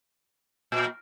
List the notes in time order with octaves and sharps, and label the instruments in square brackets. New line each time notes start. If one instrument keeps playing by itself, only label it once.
[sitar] A#2